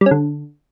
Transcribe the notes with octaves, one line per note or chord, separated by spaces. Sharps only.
G3
C#4
D3